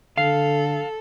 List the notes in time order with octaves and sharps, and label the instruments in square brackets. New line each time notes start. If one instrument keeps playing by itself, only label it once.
[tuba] D3 [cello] A4 [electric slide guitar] F5